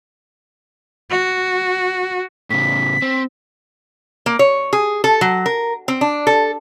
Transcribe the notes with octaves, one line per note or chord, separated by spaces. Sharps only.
F#4
A2 C#3 B6
C4
A#3
C#5
G#4
A4
F#3
A#4
C4
D4
A4